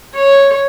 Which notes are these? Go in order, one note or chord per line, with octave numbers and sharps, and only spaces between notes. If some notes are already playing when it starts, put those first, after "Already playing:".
C#5